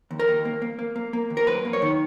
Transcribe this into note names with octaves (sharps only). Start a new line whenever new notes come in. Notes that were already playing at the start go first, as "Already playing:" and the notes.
D#2
A#4
D#2
A#3
A#3
A#3
A#3
A#3
D#2
A#4
F#2 B4
A#3
C#5
D#3